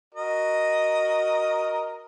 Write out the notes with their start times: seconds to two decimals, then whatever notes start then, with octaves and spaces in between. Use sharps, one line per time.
0.15 F#4 A#4 D#5